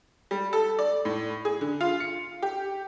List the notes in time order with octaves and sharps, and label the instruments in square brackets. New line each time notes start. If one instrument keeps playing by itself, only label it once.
[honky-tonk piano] G3
A4
D5
A2
G#4
D3
F4
C#7
G4